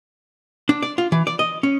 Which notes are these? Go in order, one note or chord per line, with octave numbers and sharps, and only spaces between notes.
D4
D5
F4
E3
D5
D#5
C#4